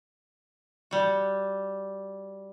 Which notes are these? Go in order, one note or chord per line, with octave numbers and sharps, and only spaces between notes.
G3 F#4